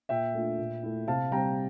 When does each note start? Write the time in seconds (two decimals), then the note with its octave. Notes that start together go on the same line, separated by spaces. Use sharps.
0.09 A#2 E5 G5
0.34 A3 D4 F4
0.59 A#2
0.83 A3 E4
1.07 C3 F5 A5
1.31 G3 C4 G5 A#5